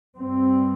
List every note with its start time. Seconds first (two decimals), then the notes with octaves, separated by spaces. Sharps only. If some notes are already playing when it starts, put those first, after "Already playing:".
0.18 G2 C4